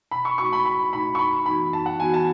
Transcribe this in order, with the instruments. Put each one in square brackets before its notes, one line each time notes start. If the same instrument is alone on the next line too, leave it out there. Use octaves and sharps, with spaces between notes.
[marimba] B2 [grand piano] B5
[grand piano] C#6
[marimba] A3 D#4 F#4 [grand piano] C#6
[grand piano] B5
[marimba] B2 [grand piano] B5
[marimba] A3 D#4 F#4 [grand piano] B5
[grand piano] C#6
[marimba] F#2 [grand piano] B5
[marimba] E3 B3 D#4 F#4 [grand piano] B5
[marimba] F#2 [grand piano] A5
[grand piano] F#5
[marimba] E3 B3 D#4 F#4 [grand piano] G#5
[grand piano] A5